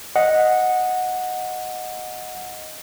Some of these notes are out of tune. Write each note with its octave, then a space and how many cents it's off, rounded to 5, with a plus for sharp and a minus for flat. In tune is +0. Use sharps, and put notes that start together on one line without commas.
D#5 +0 F#5 -10